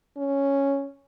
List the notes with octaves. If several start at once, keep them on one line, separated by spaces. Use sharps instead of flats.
C#4